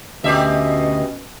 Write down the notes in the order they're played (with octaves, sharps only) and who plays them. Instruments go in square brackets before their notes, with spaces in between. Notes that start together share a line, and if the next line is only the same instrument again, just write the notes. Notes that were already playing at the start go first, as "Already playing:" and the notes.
[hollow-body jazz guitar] D2 [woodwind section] B2 C#4 [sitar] A3 G4 E5 [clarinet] D#5